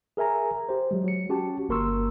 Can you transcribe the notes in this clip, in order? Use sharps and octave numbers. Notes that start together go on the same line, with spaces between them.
G#4 A#4 E5 G#5 A#5
G4 C5
F#3 G#3
F#3 C#7
C#4 F#4 G4 A5
G1 A#3 A#4 C6 C#6 E6